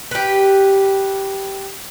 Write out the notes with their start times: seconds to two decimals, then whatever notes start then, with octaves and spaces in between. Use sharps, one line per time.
0.11 G4 B4